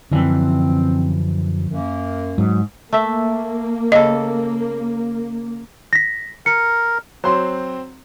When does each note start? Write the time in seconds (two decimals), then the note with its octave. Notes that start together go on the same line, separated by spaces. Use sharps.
0.11 F#2 D3 E3 F3 C4
1.70 F#2 A#3
2.38 G#2 F#3
2.93 A3 A#3 E5
3.92 C#3 A4 D#5
5.93 A#6 B6
6.46 A#4 C#7
7.24 F#3 C4 C5 C6